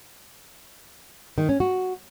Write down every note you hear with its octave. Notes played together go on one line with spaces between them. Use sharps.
D#3
C#4
F#4